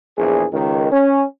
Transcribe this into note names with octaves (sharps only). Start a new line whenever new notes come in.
A#1 E2 G#4
C#2 D#3
C#4